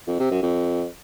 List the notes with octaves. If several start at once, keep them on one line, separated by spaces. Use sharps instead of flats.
F2
C3
F#2
F2